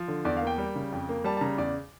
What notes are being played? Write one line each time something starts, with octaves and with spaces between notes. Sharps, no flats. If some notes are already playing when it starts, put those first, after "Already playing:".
Already playing: F3
D3
E2 D5
F5
A#3 G5
G3
C#3
F2
A#3
G3 A5
A5
C#3 A#5
E2 D5